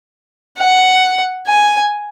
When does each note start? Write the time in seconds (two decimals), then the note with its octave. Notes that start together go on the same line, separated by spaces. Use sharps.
0.57 F#5
1.47 G#5